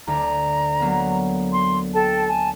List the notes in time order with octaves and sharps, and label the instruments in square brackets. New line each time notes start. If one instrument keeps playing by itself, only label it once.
[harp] D2 [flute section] A#5
[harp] F#3 A#3 B3
[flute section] C6
A4 G5 A5
G#5 A5